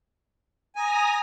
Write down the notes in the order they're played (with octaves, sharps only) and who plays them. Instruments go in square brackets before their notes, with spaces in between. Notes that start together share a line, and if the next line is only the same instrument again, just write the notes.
[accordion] G#5 [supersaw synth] A#5 D#6